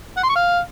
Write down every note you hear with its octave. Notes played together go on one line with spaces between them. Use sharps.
F#5
C6
C#6
F5